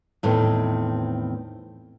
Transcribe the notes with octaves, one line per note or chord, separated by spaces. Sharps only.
E2 A2 D#3 C4